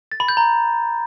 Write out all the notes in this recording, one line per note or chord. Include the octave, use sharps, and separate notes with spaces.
A6
B5
G6
A#5